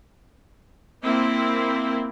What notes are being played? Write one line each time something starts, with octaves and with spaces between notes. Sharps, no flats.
A#3 C4 E4